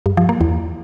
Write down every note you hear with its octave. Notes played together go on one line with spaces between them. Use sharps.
G2
F3
A#3
E2